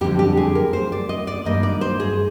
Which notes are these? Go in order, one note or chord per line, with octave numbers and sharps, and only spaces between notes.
F2 D3 G3 G4
G4
G#4
A#4
C5
D5
D#5
D5
G2 D#3 G3 A#3 D#5
D5
C5
G#4